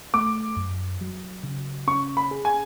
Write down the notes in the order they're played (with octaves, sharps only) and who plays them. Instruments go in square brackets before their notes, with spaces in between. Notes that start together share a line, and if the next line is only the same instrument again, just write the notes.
[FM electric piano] A3 [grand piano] D6
[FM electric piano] F#2
F#3
C#3
[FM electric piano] C#4 [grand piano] C#6
[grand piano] B5
[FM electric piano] G#4
[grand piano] G#5